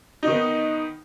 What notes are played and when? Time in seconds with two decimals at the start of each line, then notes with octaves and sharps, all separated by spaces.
0.23 D#4
0.27 D#3
0.32 B3